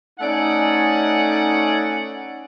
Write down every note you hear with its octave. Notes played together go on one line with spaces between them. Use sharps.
A3 C#4 D#4 D5 F#5 G#5